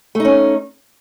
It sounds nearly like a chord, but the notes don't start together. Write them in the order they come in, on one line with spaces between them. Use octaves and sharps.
A3 D#4 C#4